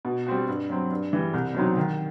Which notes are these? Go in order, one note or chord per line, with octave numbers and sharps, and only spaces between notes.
B2
G3 C4 F#4
G2
F#3 C4
G2
E3 G3
C2
B2 F#3 C4 D#4
D#3